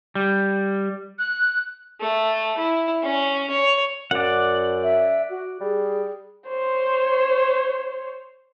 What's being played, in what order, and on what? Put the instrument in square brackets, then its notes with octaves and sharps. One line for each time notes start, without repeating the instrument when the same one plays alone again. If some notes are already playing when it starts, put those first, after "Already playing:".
[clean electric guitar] G3
[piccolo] F#6
[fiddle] A3
E4
C#4
C#5
[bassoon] F#2 [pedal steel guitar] D5 F#5
[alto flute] E5
F#4
[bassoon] G3 [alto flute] G#4
[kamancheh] C5 C#5